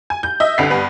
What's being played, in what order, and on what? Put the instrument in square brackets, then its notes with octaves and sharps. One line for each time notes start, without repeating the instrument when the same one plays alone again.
[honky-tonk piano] G#5
G6
D#5 E5
C2 D3 B4 B6 C7
G2 B3